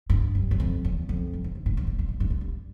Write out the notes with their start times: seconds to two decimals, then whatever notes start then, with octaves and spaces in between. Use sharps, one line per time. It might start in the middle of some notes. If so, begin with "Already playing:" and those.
0.10 G2
0.35 F#2
0.51 F#2
0.60 F2
0.85 E2
1.09 F2
1.33 G2
1.44 G#2
1.55 G2
1.66 G#2
1.77 G2
1.87 G#2
1.99 G2
2.08 G#2
2.20 G2
2.30 G#2
2.41 G2